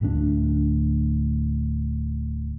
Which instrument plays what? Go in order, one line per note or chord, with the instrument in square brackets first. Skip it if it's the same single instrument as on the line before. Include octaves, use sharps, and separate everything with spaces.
[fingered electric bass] D1 D2 G#3 D4